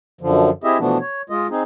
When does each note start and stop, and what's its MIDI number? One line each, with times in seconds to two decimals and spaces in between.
0.21 0.50 42
0.21 0.50 50
0.21 0.50 53
0.64 0.78 60
0.64 0.78 64
0.64 0.78 67
0.64 0.78 68
0.64 0.78 75
0.64 0.78 76
0.79 0.98 47
0.79 0.98 52
0.79 0.98 53
0.79 0.98 57
0.79 0.98 59
0.79 0.98 62
1.00 1.22 73
1.30 1.47 56
1.30 1.47 65
1.30 1.47 75
1.50 1.63 60
1.50 1.63 63
1.50 1.63 68